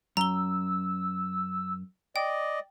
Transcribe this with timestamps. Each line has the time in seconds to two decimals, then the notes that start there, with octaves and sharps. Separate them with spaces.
0.17 F#2 A#5 E6 G7
2.16 D5 D#5 G5